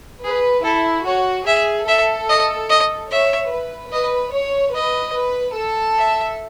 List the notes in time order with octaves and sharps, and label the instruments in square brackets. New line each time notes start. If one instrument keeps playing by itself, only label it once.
[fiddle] G#4 [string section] B4
[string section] E4 [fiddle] A4
[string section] F#4 [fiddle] C#5
[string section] G#4 [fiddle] E5
[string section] A4 [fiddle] E5
[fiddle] D#5
D#5
[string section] C#5 [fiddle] E5
[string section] B4
[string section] B4 [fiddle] D#5
[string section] C#5
[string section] B4 [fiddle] D#5
[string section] B4
A4
[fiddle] E5